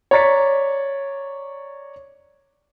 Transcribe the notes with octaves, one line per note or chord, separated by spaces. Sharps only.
C#5 D5 A#5 A6 B6 C#7